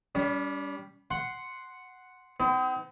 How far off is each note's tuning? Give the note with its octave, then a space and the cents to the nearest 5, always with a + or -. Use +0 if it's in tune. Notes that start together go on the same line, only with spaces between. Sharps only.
G3 +0 C#4 +45
F#5 +0 C6 +0
C4 -45 D#4 +30